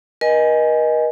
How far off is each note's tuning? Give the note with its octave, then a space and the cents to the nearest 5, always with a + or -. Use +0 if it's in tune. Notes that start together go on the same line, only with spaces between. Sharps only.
A#4 +40 D#5 +0 G#5 +0